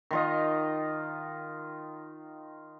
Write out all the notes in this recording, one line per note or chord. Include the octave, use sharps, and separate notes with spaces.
D#3 F4 D#5